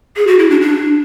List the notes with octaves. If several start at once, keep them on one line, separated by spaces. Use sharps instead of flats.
G#4
F#4
E4
D4
D4